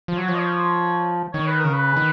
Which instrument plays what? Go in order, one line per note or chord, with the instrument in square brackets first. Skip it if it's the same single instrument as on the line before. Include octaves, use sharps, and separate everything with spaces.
[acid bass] F3
[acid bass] F#3 [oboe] C#5
[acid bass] F3
[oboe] D#5
C#5
[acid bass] D#3 [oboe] C#5
[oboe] B4
[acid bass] C#3 [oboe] A#4
[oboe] B4
[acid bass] D#3